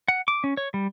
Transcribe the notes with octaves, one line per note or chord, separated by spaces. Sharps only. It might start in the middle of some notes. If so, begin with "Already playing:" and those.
F#5
D6
C#4
C#5
G3